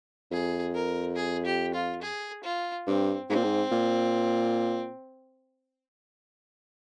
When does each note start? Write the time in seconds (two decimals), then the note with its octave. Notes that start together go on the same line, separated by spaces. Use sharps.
0.31 F2 G#4
0.75 A#4
1.16 G#4
1.45 G4
1.74 F4
2.02 G#4
2.44 F4
2.87 G2 C4
3.30 G#2 C4
3.36 A#2
3.44 G#2
3.72 A#2